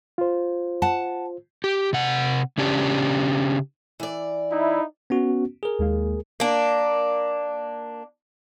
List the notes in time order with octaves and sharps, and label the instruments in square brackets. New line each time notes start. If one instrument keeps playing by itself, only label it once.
[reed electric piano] F4 C5
[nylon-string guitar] F#5 A5
[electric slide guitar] G4
C3 F#5
C#3 C#4 D4 G4
[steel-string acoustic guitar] E3 D5
[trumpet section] D#4 E4
[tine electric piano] B3 C#4 F#4
G#4 A#4
[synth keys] D#2 G#3 A#3
[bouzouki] A#3 D4